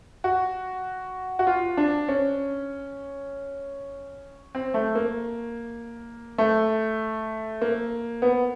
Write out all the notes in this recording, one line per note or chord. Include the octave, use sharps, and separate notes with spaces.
F#4
F#4
F4
D4
C#4
C4
A3
A#3
A3
A#3
B3